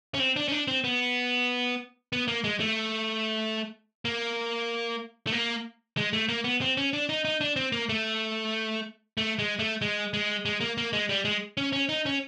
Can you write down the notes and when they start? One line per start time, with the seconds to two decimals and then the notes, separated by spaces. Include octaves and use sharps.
0.14 C#4
0.19 C4
0.36 D4
0.48 C#4
0.52 D4
0.68 C4
0.84 B3
2.13 B3
2.28 A#3
2.44 G#3
2.60 A3
4.05 A#3
5.27 A3
5.32 A#3
5.97 G#3
6.13 A3
6.29 A#3
6.44 B3
6.61 C4
6.77 C#4
6.93 D4
7.09 D#4
7.25 D#4
7.41 D4
7.56 C4
7.72 A#3
7.89 A3
9.18 A3
9.39 G#3
9.59 A3
9.82 G#3
10.14 G#3
10.45 G#3
10.61 A#3
10.78 A#3
10.93 G#3
11.09 G3
11.25 G#3
11.57 C#4
11.73 C#4
11.89 D#4
12.06 C#4